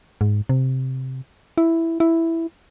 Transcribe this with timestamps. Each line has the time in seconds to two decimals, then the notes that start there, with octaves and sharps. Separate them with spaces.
0.21 G#2
0.49 C3
1.58 E4
2.00 E4